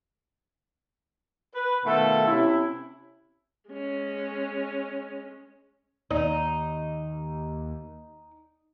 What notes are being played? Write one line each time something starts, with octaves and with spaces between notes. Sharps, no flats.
B4
B2 D#3 A3 F4 A4
C3 C#4 E4
G#3 C#4
D#2 D#4